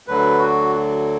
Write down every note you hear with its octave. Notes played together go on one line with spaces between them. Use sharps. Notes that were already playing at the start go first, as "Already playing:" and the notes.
D2 D3 F#3 B4
F#4